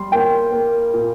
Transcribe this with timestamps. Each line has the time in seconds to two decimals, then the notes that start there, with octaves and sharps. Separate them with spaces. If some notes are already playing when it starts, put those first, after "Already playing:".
Already playing: G3 C6
0.12 A#3 G5
0.52 A#3
0.94 A#2